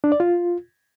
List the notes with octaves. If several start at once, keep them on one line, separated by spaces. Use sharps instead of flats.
D4
D5
F4